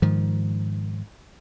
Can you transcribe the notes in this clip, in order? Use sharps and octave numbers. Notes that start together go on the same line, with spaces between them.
G#2 D#3 F3